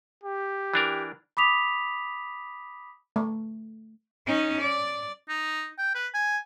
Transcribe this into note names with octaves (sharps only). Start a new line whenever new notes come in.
G4
E3 D4 A#4
B5 D6 D#6 B6 F7
A3
C#4 D#4
D5
D#4
G5
B4
G#5